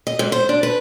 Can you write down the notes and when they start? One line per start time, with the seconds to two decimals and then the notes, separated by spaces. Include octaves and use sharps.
0.07 D#5
0.19 G#2
0.32 C5
0.49 D4
0.63 B4